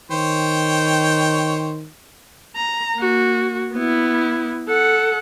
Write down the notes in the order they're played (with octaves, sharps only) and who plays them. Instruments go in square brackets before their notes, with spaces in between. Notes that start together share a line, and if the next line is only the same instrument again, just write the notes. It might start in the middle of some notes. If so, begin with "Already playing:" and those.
[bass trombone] D#3 [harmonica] C5 C#5 G5
[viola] A#5
A#3 F#4
B3 E4
A4 F#5